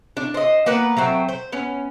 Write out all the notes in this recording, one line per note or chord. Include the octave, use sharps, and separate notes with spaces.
D4
C5 D#5
A#3 B3 B4 F#5
F#3 A3 C4
C5
B3 C#4